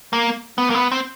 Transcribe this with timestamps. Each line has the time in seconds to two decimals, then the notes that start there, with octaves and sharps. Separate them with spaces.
0.13 A#3
0.58 B3
0.70 A#3
0.75 B3
0.92 C4